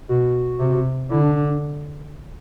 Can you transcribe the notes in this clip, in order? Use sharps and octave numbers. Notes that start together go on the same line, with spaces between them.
B2 F#4
C3
D3 E4
D4
D4
D4